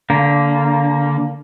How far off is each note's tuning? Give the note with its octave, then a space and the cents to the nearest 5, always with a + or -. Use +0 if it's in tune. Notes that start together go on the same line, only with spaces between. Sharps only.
D3 -25 A#3 +0